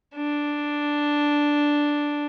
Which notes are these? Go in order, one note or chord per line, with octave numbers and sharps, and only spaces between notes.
D4